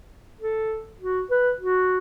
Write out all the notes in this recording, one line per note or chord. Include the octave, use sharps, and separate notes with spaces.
A4
F#4
B4
F#4